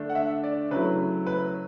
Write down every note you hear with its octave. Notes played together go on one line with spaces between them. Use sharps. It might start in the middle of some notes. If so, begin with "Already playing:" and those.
Already playing: D3 A3 D4
F#5
E5
D5
C#3 F#3 A3 E4 B4
B4